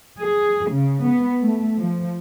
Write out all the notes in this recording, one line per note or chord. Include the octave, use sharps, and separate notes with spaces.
G#4
C#3
B3
A3
F3